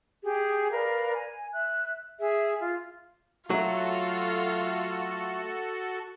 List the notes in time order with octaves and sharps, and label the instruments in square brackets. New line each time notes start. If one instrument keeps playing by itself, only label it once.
[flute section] G4 G#4
A#4 B4 D5 F5
G#5
E5 F#6
G#4 E5
F4
[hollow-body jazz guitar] F#3 [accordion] A3 [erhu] F4 [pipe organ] F#4 A4